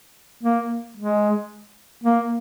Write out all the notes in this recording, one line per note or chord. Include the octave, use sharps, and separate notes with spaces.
A#3
G#3
A#3